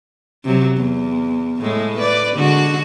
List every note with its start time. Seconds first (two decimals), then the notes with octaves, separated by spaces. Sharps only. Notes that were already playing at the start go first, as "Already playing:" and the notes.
0.45 C3 F#3
0.76 E2
1.62 A2 G#3 A3
1.98 B4 D5
2.35 D3 G#3 F#4